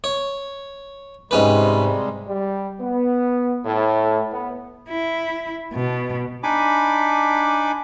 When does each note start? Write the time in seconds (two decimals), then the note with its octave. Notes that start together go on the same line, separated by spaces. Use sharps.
0.04 C#5
1.31 G#2 C3 G3 G#3 C#4 B4
2.27 G3
2.80 B3
3.65 A2
4.32 B3
4.90 E4
5.74 B2
6.43 D4 D#4 G#5 B5 D6